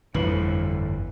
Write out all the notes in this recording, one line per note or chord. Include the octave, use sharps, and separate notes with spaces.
G1 F2 A2 D3 E3 B4 F#7